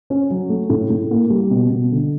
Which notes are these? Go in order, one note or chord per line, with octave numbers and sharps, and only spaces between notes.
C#4
F#3
A3
A2
A2
A#3
G3
B2
B2
D3